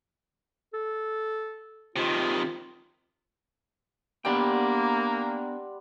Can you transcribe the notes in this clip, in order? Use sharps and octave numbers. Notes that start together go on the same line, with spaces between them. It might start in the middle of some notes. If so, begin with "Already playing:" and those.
A4
C3 D#3 F4
G3 A#3 B3 D4 F#5 G5 C6